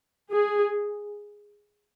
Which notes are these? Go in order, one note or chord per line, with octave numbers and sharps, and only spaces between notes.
G#4